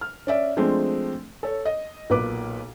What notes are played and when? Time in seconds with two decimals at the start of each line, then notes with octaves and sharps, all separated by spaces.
0.01 F6
0.27 C#4 D5 E5
0.57 F3 G#3 A3 C4 D4
1.43 A4 C#5
1.65 D#5
2.10 B1 A#2 B4 D6